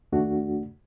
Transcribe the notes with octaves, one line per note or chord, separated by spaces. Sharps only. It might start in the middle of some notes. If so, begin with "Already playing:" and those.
D#2 A3 D4 F#4